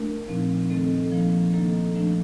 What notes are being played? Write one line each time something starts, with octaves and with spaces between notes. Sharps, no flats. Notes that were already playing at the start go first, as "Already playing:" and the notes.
Already playing: A3 D4 A#4
A#2 F3 C4 D#4
D#3 A3 C4 A4
F3 A#3 D#4
D#3 A#3 D4 A4
F3 A3 D4